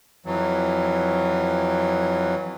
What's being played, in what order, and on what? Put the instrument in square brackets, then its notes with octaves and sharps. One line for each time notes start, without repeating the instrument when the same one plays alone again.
[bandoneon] F2 E3 F#3